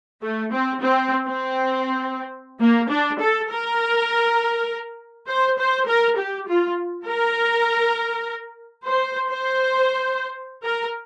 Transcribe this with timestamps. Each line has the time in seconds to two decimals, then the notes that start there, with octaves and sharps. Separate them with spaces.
0.22 A3
0.53 C4
0.82 C4
1.27 C4
2.61 A#3
2.91 D4
3.20 A4
3.51 A#4
5.28 C5
5.59 C5
5.88 A#4
6.18 G4
6.48 F4
7.07 A#4
8.86 C5
9.30 C5
10.64 A#4